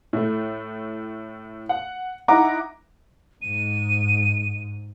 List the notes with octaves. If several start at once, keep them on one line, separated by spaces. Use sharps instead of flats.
A2 A3
F#5
D#4 E4 F#5 A#5 D6
G#2 D#7